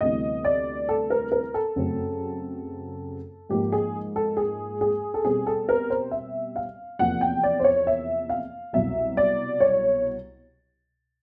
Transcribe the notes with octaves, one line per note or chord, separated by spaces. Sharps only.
D2 C3 E3 G3 B3 D#5
D5
A4
A#4
A#4
A4
F#2 C#3 F#3 A3 C4
G#2 F3 A#3 G4
G#4
A4
G#4
G#4
A4
B2 G3 C4 G#4
A4
A#4
C5
E5
F5
E2 C3 F3 A#3 F#5
G5
D5
C5
C#5
E5
F5
C2 B2 F#3 E5
D5
C#5